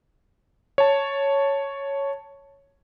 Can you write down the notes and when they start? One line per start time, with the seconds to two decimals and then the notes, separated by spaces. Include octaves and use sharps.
0.78 C#5 A5